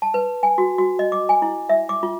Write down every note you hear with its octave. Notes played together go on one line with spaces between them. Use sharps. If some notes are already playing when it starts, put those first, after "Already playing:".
A5
B4
G#5
F#4
F#4
D#5
D6
G#5
E4
E5
D6
F4